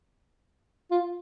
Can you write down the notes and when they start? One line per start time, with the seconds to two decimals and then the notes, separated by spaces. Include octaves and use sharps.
0.91 F4